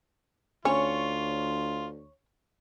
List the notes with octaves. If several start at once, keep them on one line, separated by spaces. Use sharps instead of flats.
D2 C#4 F4 C#5